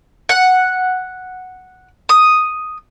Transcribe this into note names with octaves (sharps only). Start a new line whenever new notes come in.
F#5
D#6